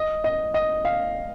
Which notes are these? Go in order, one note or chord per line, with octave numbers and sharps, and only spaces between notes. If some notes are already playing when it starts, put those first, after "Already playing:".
Already playing: D#5
D#5
D#5
F5